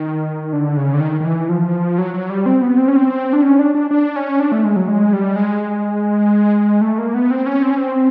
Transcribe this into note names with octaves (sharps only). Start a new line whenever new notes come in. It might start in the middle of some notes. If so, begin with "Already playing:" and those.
Already playing: D#3
D3
C#3
D3
D#3
D#3
E3
F3
F#3
F#3
G3
C4
B3
C4
C#4
C4
D4
C#4
D4
D4
D4
C#4
D4
A3
G#3
F#3
G#3
G3
G#3
A3
A#3
B3
C4
C#4
C4
C#4
C4